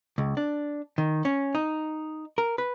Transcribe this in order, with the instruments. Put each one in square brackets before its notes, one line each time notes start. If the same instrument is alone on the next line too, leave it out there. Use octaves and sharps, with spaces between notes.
[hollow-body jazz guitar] C#2
D4
D#3
C#4
D#4
A#4
B4